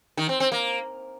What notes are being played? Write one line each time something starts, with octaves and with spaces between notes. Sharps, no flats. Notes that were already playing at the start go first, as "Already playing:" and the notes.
D#3
C4
C4
A#3